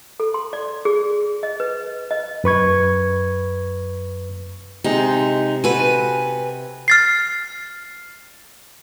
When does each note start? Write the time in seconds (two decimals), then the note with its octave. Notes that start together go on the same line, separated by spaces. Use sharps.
0.20 A4
0.34 C6
0.53 D5
0.85 G#4
1.43 D#5
1.60 B4
2.11 D#5
2.44 F#2 B4 C#6 G#6
4.84 C3 G#3 D#4
5.64 F#4 A4 B4 G#5
6.88 F6 A6 C7